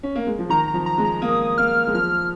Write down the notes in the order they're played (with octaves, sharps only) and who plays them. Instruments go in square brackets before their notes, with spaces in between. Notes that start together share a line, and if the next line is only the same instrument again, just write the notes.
[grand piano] C#4
A#3
G#3
F3
[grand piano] D#3 [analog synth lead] A#5
[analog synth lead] A#5
[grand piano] F3
[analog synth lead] A#5
[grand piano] G#3
[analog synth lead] A#5
[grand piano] A#3 [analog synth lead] D#6
[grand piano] A#3 [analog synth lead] F6
[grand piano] G#3
[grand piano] F3 [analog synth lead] F6